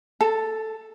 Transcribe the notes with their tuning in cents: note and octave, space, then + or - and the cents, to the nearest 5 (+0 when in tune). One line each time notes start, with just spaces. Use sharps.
A4 +0 A5 +40